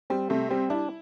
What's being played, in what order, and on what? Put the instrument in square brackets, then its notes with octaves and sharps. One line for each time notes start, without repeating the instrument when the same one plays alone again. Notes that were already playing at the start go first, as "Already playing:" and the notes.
[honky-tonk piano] G3 [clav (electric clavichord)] C4
[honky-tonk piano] C3 [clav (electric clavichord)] A3
[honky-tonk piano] G3 [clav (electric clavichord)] C4
[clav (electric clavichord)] D4 [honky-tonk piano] E4